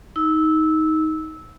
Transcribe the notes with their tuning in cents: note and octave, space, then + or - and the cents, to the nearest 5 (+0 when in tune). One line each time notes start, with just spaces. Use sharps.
D#4 +15 E6 -15